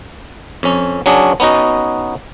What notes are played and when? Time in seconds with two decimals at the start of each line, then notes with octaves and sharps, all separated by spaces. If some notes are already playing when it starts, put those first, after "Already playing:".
0.63 F2 C#4
1.06 F#3 C#4 D4 G#4
1.40 B3 C#4 D#4 F#4 D#5